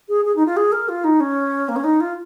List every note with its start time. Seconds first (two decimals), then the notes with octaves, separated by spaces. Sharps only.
0.09 G#4
0.25 G#4
0.36 D#4
0.46 F4
0.57 G#4
0.72 A#4
0.89 F4
1.04 D#4
1.20 C#4
1.69 A#3
1.76 C#4
1.84 D#4
2.00 F4